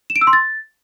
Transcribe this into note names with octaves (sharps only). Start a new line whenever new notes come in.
E7
D7
E6
C6
A6